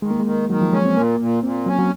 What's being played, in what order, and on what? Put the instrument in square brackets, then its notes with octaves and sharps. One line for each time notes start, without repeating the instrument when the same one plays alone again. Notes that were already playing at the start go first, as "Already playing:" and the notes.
[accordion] D#3 [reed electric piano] G#3
[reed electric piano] A#3
G#3
[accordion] D#3
[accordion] D#3 [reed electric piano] F#3
[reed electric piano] F3
[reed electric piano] G#3 [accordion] C#4
[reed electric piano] C4
[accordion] A#2 [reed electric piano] A#3
[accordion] A#2
[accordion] A#2 [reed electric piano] C4
[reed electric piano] F#3 [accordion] C#4
[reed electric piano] F#3